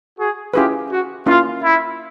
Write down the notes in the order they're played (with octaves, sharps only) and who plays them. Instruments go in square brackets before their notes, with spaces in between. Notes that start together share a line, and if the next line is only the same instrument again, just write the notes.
[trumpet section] F#4 G#4
[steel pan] C#4 E4 G#4 B4 [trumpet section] F4 G4
[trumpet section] F#4
[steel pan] A#3 C#4 E4 [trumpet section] F4
[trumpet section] E4